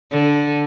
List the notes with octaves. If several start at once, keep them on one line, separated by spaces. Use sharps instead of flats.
D3